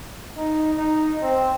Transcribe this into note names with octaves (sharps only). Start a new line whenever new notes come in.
D#4
D#4
C4